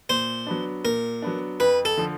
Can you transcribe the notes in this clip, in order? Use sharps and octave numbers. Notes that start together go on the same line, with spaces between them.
A#2 C5
F#3 B3 D4
A#2 A#4
F#3 B3 D4
F2 B4
A4
D3 F3